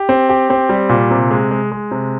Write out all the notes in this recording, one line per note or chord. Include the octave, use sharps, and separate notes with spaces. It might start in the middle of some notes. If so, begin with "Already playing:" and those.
Already playing: G4
C4
G4
C4
G3
A#2
C3
G#3
G#3
G#3
C3